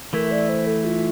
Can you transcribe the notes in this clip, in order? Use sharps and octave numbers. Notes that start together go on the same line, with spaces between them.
E3 A3 E4 A#4
D5
C5
A4
F4